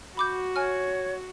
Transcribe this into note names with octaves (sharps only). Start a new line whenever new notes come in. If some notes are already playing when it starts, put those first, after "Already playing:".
F#4 B5 D6 G6
C#5 G#5 F6